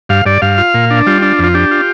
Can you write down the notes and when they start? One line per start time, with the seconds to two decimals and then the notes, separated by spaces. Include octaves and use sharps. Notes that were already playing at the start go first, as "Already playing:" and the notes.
0.09 G2 F5
0.26 G2 D5
0.42 G2 F5
0.58 F4
0.74 A#2
0.91 D4
1.06 G3 F4
1.22 D4
1.39 F2 F4
1.54 D4 G4
1.71 F4